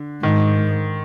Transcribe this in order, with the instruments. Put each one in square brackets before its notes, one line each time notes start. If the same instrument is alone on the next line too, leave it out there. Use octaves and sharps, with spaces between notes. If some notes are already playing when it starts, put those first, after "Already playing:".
Already playing: [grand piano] D3
[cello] G#2 [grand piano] D#3